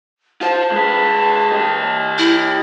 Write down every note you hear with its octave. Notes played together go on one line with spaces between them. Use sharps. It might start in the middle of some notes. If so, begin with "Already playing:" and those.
F4 C5 A5
G#3 B4
G4 D#5
E4